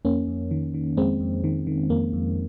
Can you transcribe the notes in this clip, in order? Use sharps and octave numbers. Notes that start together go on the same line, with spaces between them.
F2 A#3 C#4
F2
D#3
D#3
F2 G#3 C4
F2
D#3
D#3
F2 A#3
F2